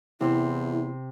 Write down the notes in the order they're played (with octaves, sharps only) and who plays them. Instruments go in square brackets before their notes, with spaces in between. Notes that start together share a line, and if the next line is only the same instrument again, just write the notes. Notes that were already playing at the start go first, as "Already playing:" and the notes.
[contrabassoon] E2 [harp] C3 C4 C5 [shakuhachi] E4